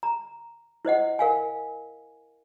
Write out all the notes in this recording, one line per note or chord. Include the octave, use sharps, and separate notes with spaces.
A#5
E4 C5 D#5 F#5
A#4 F5 G#5